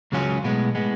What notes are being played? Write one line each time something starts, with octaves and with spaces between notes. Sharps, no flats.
C#2 C#3 F#3 C#4 F4
B1 A2 G#3 B3
A2 G#3 B3